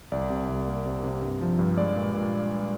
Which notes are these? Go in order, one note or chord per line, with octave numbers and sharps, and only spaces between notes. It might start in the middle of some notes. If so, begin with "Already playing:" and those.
C2 D5
C3
C2
A#3
C3
C3
G2
F3
G2
G#3 D5
A#2
A#2